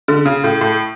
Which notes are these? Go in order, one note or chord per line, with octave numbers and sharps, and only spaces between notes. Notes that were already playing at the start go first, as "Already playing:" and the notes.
D3
C#3
A2
A2